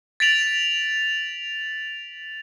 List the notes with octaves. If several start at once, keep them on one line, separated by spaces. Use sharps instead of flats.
A6 B6 D7 F7 F#7